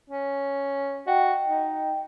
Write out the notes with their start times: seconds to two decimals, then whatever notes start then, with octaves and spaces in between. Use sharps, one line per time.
0.10 C#4
1.07 F#4 D#5 G5
1.47 D#4